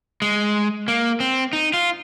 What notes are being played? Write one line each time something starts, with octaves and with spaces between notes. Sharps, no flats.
G#3
A#3
C4
D#4
F4